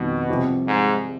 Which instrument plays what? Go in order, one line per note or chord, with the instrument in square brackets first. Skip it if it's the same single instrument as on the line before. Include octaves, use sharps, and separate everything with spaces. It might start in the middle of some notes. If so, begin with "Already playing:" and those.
Already playing: [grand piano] F2 D#3 G3 [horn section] B2
[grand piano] C2 C3 F3 C4 G4
[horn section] G#2